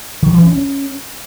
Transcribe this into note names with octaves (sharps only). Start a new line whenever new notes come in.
D#3
E3
C#4
C#4